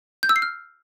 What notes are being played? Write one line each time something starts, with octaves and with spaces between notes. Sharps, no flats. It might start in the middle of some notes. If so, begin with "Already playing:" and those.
G6
E6
C7
F6